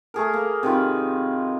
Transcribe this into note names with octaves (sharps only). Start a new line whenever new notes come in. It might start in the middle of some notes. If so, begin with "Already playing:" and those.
A3 G#4 A#4
A#3
C3 D#3 F4 B5